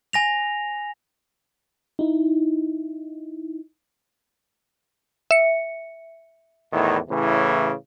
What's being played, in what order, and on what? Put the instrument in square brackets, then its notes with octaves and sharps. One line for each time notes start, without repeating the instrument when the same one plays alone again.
[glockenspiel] G#5 A#6 F7
[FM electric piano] D#4 E4
[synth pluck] E5 C#7
[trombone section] E2 A2 D#3
A2 C#3 E3